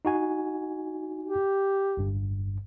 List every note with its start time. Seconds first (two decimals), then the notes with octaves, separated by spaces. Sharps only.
0.05 D#4 F#4 G#5
1.23 G4
1.97 G1 G2